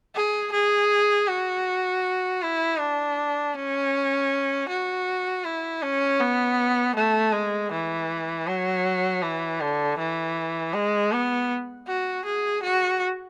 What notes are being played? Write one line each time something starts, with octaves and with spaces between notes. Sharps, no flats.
G#4
G#4
F#4
E4
D4
C#4
F#4
E4
C#4
B3
A3
G#3
E3
F#3
E3
D3
E3
G#3
B3
F#4
G#4
F#4